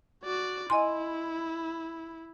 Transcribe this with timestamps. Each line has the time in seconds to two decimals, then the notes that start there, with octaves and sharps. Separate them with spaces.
0.24 F#4 D5
0.70 E4 D#5 G#5 C6